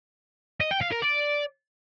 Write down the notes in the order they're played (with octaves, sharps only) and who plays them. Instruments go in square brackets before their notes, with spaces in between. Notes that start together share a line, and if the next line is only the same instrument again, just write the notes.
[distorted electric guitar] D#5
G5
F5
A#4
D5